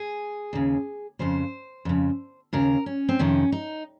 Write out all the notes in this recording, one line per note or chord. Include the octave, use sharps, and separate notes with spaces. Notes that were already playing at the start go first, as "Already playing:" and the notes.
Already playing: G#4
D#2 C#3
F2 C#3 C5
F2 C#3
D#2 C#3 A#4
C#4
C4
F2 C3 D#3 C#4
D#4